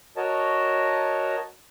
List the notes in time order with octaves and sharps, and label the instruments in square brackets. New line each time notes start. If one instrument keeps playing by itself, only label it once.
[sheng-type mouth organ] F#4 A#4 C#5 D#5 A5